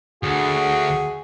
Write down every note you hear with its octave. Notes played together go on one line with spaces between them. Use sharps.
D2 F#4 G#4